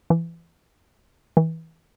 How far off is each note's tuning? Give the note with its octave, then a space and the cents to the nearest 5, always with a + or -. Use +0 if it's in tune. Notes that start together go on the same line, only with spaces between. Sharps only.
E3 +25
E3 -25